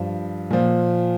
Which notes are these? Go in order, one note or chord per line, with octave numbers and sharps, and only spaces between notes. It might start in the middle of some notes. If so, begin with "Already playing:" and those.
Already playing: G2 F3
A#2 F3